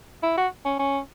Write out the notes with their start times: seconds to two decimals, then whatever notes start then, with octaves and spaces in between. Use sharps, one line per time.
0.23 E4
0.37 F#4
0.65 C#4
0.79 C#4